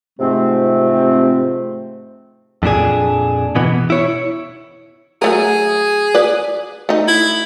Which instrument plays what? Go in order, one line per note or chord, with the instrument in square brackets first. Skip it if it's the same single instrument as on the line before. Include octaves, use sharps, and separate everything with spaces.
[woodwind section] G#2 C3 F3 A3 C4
[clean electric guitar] F2 A#2 D4 G#4
B2 E3 B3
E4 C#5
[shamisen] F#3 A3 A#4 [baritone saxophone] G#4
[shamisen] B4 D5
A3 D#4
[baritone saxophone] E4